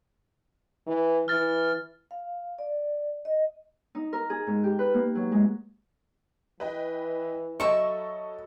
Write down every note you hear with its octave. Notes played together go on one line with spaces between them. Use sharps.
E3
E3 F6 A6
F5
D5
D#5
D#4
A#4
G#4
G#2
G4
B4
A#3
F#3
G#3
E3 B4 D#5 G5
F#3 F#4 A4 D#5 E5 B5 C#6